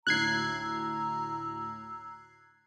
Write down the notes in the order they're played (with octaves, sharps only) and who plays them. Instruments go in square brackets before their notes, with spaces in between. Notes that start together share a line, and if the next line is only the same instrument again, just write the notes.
[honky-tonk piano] D2 A2 [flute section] A#5 E6 [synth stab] F#6 G#6 C7